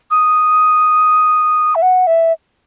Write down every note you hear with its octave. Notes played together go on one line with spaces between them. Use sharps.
D#6
E5
F#5
E5